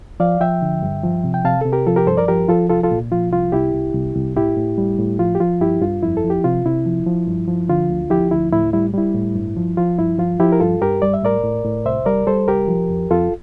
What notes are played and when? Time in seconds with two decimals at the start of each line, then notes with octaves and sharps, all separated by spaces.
0.20 F3 D5 F5
0.40 F3 E5 G5
0.62 D3
0.82 G2
1.03 F3
1.24 C3
1.34 G5
1.45 C3 F5 A5
1.61 C3 A4
1.72 G4 A#4
1.86 F3 F4 A4
1.96 G4 A#4
2.07 G2 A4 C5
2.17 A#4 D5
2.28 F3 G4 A#4
2.48 F3 F4 A4
2.70 C2 F4 A4
2.83 F4 A4
2.91 A#2
3.11 F3 F4
3.32 C2 F4
3.52 C2 E4 G4
3.74 C2
3.94 C2
4.15 C2
4.36 A2 E4 G4
4.57 A2
4.78 G3
4.99 A2
5.19 F3 F4
5.35 G4
5.40 F3 F4
5.61 G2 E4 G4
5.82 G2 F4
6.03 F2 E4
6.17 A4
6.24 F3
6.30 G4
6.44 C3 F4
6.65 C3 E4
6.86 F3
7.06 F3
7.27 G2
7.48 F3
7.69 D3 F4
7.90 D2
8.10 F3 E4 G4
8.31 D2 E4
8.52 A2 E4
8.73 G3 E4
8.94 G3 E4
9.15 A2
9.36 G2
9.57 F3
9.77 F3 F4
9.98 G2 E4
10.18 F3 F4
10.40 F3 E4 G4
10.52 A#4
10.60 G2 F4 A4
10.81 G2 G4 A#4
11.02 G3 D5
11.14 E5
11.22 A2 A#4 D5
11.44 A2
11.64 A2
11.85 C2 C5 E5
12.06 G3 A#4 D5
12.27 G3 A4 C5
12.48 C2 G4 A#4
12.68 F3
12.90 F2
13.10 F2 F4 A4